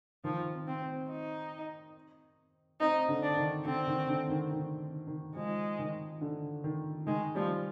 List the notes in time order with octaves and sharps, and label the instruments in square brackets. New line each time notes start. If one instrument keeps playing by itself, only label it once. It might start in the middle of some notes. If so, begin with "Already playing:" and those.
[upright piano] D#3 [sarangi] F3
[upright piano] C4
[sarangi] C4
[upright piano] C4
[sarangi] D#4
[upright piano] C4 [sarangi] D#4
[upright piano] D3
[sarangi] D4
[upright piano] D#3
[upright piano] D3 [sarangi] C4
[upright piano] D#3
D3
D#3
D#3
D#3
[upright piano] F3 [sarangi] G#3
[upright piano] D#3
D3
D#3
[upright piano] D#3 [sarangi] G#3
[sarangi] F3 [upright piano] G3